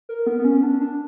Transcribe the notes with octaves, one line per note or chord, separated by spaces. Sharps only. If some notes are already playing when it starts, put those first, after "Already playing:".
A#4
B3
B3
C#4
D4
D4